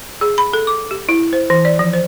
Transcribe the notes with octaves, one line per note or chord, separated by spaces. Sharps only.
G#4
B5
A4
D6
G4
E4
C5
E3
D5
F3
C5